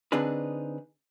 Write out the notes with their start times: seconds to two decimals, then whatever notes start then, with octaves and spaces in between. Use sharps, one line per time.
0.12 D3 C4 D4 D#4 G#4 B4